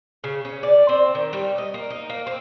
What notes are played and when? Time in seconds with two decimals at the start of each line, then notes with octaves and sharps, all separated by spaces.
0.24 C#3
0.45 C#4
0.63 D5
0.89 C4
1.15 D#3
1.33 G3
1.58 D#5
1.74 A#3
1.90 D#4
2.10 A#3
2.27 C4